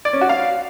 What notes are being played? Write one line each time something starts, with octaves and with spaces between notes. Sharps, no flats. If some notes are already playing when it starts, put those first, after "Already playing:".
D5
C#4
F#4
F5